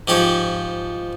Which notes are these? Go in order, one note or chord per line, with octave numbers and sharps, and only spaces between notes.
G#2 F3 G4 C#5